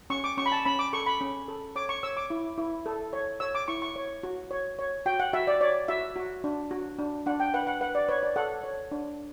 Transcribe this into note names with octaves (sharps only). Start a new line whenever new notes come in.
C#4 C#6
D6
C#4 C#6
B5
A5
C#4 B5
D6
A4 C#6
B5
C#4
A4
C#5 D6
C#6
C#5 E6
D6
E4
E4
A4
C#5
C#5 E6
D6
E4 C#6
C#6
C#5
F#4
C#5
C#5
F#4 G5
F#5
F#4 E5
D5
C#5 D5
F#4 E5
F#4
D4
F#4
D4
D4 F#5
G5
B4 F#5
F#5
B4 F#5
D5
B4 C#5
D5
A4 F#5
C#5
D4